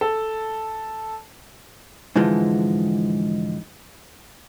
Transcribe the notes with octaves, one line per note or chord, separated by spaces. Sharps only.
A4
G#2 D3 E3 F3 G#3